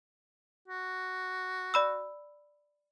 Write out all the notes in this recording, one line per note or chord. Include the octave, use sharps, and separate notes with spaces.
F#4
D5 B5 E6